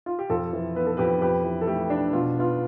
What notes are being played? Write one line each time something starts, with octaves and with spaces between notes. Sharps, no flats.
F4
G4
F2 F4 A4
E3
B3 B4
A4
F2 G4 B4
F2 G4 B4
E3
A4
A3 G4
D4
B2 F4
B3 F4